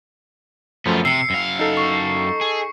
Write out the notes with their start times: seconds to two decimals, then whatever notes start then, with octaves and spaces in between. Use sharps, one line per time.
0.86 F#2 F3 A3 B3 F4
1.05 C3 E6 C7 C#7
1.30 F#2 F5
1.59 D#4 A4
1.77 C#6
2.41 G#4